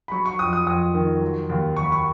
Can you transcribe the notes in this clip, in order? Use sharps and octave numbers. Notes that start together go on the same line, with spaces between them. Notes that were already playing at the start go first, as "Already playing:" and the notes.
B5
F#3 C#6
C#6
F2 D#6
D#6
F2 D#6
D#3
F#3
D#2
D#2 C#6
B5
C#6